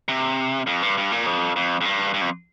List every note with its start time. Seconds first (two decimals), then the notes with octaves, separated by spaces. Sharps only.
0.08 C3
0.67 F2
0.82 G2
0.97 G2
1.12 A#2
1.26 F2
1.56 F2
1.81 F2
1.85 G2
2.14 G2
2.21 F2